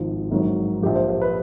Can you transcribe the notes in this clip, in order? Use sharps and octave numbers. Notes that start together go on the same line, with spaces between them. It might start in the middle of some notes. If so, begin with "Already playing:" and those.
Already playing: G#1 G#2 F3
A#1 G#2 D#3 F#3
A#1 A#2 F3 G4
C5
C5
B4